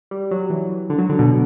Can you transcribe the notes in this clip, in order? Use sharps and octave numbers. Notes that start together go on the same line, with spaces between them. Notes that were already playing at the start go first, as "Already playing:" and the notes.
G3
F#3
E3
D3
F#3
D3
B2